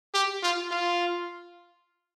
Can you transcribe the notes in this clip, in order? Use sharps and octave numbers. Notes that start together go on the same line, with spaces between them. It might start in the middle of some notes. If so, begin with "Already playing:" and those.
G4
F4
F4